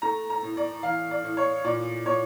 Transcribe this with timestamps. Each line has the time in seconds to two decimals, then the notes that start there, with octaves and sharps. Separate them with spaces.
0.02 A3 A#5
0.30 A#5
0.43 A2
0.57 D5
0.83 E3 F5
1.11 D5
1.24 A2
1.37 C#5
1.64 A#2 D5
2.06 A#2 C#5